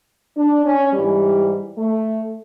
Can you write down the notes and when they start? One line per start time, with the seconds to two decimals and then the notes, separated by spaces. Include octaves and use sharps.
0.37 D4
0.65 C#4
0.93 G#2 E3 G3
1.78 A3